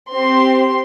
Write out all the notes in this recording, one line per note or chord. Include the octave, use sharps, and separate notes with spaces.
C4 G4 C6